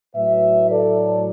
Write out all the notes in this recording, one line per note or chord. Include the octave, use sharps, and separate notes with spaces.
A2 F#3 B4 E5
A4 D5